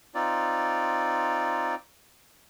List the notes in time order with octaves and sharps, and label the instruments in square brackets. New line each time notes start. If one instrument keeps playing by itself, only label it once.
[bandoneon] C4 D#4 F4 D5